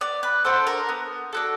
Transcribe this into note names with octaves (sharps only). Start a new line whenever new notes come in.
B3 D5
B4
D4 F#4 A4 C5
A#4
B3
D4 F#4 A4